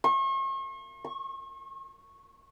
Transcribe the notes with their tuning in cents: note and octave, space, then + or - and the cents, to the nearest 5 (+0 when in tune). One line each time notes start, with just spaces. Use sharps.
C#6 -45
C#6 -10